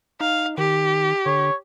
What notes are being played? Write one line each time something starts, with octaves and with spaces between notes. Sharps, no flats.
D#4 F5
D#3 G4
D3 C#5